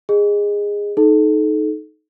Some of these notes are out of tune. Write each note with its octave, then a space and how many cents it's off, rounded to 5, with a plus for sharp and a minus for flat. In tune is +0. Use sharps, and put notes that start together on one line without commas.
G#4 -20 D#5 -10
D#4 +0 A4 -30